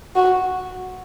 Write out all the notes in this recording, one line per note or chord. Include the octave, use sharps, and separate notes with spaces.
F#4